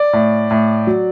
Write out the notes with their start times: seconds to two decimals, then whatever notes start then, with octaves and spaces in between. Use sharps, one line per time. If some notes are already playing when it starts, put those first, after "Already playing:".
Already playing: D5
0.13 A2
0.51 A2
0.87 F#3